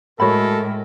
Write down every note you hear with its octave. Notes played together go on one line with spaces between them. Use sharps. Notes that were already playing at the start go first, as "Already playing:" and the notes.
A2 G#3 F#4 A4 A#4 C#5 B5